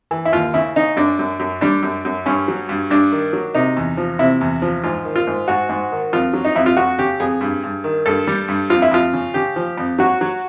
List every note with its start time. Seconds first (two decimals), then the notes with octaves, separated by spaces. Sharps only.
0.11 E3
0.25 E4
0.32 D#2 F4
0.54 C#3 E4
0.76 C#3 D#4
0.97 F#2 D4
1.19 F#2
1.39 F#2
1.61 G3 D4
1.82 F#2
2.05 F#2
2.26 G2 C#4
2.48 F#3
2.69 G2
2.90 G2 D4
3.12 D#3
3.33 F#3
3.55 C3 D#4
3.77 E2
3.97 F3
4.19 C3 E4
4.41 E2
4.62 F3
4.84 G#2 F4
5.05 D#3
5.16 F4
5.27 G#2
5.48 G#2 F#4
5.69 G#2
5.92 D#3
6.13 F2 F4
6.33 F#3
6.45 D#4
6.55 F2 E4
6.66 F4
6.77 F2 F#4
6.99 C#3 G4
7.20 F2 G#4
7.41 G2
7.64 G2
7.84 D#3
8.06 G2 A4
8.27 G3
8.48 G2
8.70 F2 F4
8.82 E4
8.92 F2 F4
9.13 C#3
9.34 C#3 G4
9.56 F3
9.78 F2
9.99 F#3 F#4
10.21 F#3